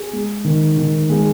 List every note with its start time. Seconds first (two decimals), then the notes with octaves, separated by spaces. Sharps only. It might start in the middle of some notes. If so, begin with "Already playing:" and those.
Already playing: G#4
0.13 G#3
0.44 D#3
0.77 D#3
1.10 G#3